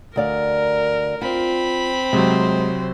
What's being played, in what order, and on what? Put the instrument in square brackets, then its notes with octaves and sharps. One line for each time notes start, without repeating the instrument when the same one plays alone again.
[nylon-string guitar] D2 D5 F5 [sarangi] A#4
[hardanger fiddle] C4 B5 [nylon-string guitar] F4
[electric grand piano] C3 F#3 [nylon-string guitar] G#3 [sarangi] C5